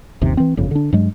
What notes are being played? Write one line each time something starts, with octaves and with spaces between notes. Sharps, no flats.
G1 D#2 C3
E3 C4
G1 F2 C#3
D3 D4
G2 F#3 G#3